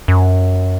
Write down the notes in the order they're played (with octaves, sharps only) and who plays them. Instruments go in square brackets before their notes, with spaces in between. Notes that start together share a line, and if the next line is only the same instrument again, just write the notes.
[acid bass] F#2